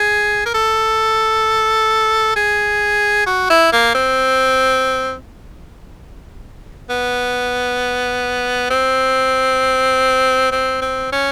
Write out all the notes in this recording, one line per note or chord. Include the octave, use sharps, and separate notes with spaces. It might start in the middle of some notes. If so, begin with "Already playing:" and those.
Already playing: G#4
A#4
A4
G#4
F#4
E4
A#3
C4
B3
C4
C4
C4
C#4